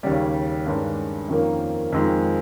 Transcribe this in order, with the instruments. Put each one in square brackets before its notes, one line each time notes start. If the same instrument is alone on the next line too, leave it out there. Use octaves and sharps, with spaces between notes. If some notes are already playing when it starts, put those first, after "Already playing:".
[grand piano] D#2 C#3 G3
G2 D#3 G#3 C#4
F2 D#3 A#3 C#4
F2 D#3 G#3